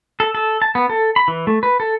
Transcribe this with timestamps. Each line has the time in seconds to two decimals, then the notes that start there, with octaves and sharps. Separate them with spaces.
0.20 A4
0.35 A4
0.62 A5
0.75 B3
0.90 A4
1.16 B5
1.28 E3
1.47 A3
1.63 B4
1.80 A4